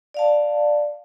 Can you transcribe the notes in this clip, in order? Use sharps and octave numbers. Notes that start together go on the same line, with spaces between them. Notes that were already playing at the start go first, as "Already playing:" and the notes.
D5 F5 A5